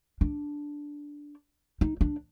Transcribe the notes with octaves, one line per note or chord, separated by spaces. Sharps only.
D4
D#4
D4